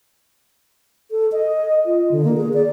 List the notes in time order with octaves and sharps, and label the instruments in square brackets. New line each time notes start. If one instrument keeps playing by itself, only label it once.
[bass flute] A4
D#5
F4
D3
A#3
G#4
D5